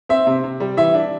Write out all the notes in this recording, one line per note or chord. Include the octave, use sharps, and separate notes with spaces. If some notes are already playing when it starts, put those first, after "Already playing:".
C4 E5
C3
C3
G3
E3 E5
D4